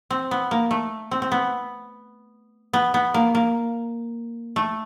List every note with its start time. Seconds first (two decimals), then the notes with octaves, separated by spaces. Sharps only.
0.10 C4
0.31 B3
0.51 A#3
0.71 A3
1.11 C4
1.22 C4
1.32 B3
2.73 B3
2.94 B3
3.14 A#3
3.35 A#3
4.56 A3